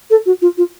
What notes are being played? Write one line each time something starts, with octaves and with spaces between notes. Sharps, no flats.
A4
F#4
F4
F4